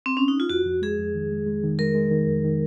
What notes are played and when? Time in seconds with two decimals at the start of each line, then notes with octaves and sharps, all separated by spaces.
0.06 C4
0.17 C#4
0.28 D#4
0.40 F4
0.50 F2 F#4
0.66 F2
0.82 G#3 G#4
0.99 F2
1.14 D#3
1.31 G#3
1.46 G#3
1.63 D#3
1.79 G#3 A#4
1.95 G#3
2.11 D#3
2.27 F2
2.45 D#3